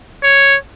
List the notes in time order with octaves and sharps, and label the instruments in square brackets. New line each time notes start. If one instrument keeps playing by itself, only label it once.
[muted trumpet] C#5